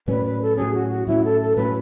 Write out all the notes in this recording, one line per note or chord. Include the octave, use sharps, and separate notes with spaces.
A2 F#3 C#4 B4 D5
B4
A4
A2 F#3 C#4 G#4
F#4
F#4
A2 F#3 C#4 E4
A4
A4
A2 F#3 C#4 B4